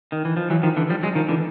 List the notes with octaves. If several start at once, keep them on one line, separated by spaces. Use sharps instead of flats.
D#3
E3
F3
E3 F#3
D#3 F3
D3 E3
F3 G3
F#3 G#3
D#3 F3
D3 E3